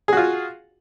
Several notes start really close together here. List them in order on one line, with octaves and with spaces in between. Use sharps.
G#4 F#4 F4